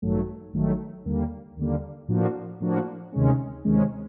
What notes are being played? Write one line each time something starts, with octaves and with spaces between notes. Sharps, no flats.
A1 G2 D#3 F#3 A3
A1 G2 D#3 F#3 A3
D#2 D3 G3 A#3
D#2 D3 G3 A#3
A2 F3 A#3 D4 F#4
A2 F3 A#3 D4 F#4
D2 C3 D#3 G#3 C#4
D2 C3 D#3 G#3 C#4